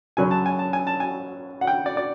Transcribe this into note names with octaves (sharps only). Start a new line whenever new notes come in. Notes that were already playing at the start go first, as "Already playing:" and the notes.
F#2 C#3 F#3 G#5
A5
G#5
A5
G#5
A5
G#5
F#5
G5
D5
D5